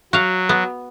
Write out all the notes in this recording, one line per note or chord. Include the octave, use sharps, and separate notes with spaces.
F#3 F#4 F5
B3